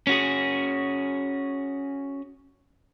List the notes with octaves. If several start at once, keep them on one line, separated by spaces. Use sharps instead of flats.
C#4 F#4 G#4